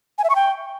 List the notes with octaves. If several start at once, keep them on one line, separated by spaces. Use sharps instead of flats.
G#5
E5
C#6
G5